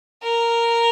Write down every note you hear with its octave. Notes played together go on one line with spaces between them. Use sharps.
A#4